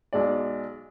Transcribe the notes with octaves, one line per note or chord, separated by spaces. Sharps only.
B1 G#3 D5